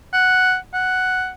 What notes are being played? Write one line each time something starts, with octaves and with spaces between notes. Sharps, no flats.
F#5
F#5